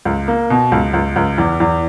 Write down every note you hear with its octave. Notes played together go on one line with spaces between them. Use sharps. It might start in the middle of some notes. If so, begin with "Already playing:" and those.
C#2
A#3
B2
C#2
C#2
C#2
E2
E2